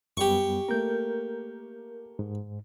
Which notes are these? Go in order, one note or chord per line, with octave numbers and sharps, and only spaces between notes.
F#2 G3 B3 G4 C#6
A3 A#3 A#4 G6
G#2